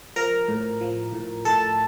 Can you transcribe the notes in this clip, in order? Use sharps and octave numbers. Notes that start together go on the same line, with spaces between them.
F3 A#4 A#5
A2
F3
A2
A2 A4 A5